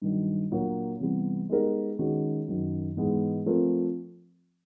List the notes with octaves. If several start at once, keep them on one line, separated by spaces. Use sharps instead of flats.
G2 D#3 F#3
A#2 F#3 A#3 D4 F#4
C3 E3 G3 B3
G#3 B3 D#4 G4 A#4
D#3 G#3 C#4 F#4
F#2 D#3 F#3
G#2 E3 G#3 B3
F3 A3 C4 F4 A#4